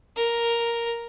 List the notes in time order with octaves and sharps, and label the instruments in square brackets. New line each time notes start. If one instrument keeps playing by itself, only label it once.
[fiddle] A#4